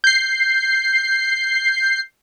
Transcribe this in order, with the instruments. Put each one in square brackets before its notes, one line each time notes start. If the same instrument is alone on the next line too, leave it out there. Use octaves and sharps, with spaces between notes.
[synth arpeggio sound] G6 C7